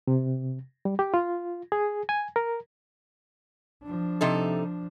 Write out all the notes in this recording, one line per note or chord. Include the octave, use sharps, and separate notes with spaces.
C3
G3
G4
F4
G#4
G#5
A#4
F3 D4
C3 D#4 A4